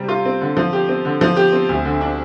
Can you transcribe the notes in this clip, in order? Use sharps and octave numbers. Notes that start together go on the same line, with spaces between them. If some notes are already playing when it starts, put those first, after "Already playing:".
Already playing: C3 G3 C4
F4
C4
D3
F3
G4
C4
D3
F3
G4
C4
D2
D3
D4